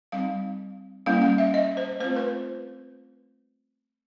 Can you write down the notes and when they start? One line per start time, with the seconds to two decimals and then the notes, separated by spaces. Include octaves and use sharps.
0.12 G3 C4 D#4 F5
1.06 G3 A#3 C#4 E4 F5
1.22 F5
1.38 E5
1.54 D#5
1.77 C5
2.00 A3 C4 F4 C5
2.16 B4